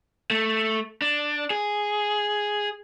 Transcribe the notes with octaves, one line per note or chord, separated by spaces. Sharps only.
A3
D4
G#4